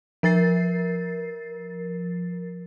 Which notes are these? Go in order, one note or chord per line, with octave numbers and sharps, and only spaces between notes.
F3 A#4 A6 C7